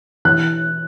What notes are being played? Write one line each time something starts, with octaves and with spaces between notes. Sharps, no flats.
E3 F#6